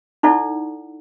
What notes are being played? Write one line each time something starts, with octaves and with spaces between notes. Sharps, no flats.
D#4 E4 A4 D5 F#5